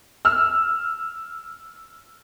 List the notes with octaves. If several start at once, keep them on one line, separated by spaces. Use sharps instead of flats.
E6 F6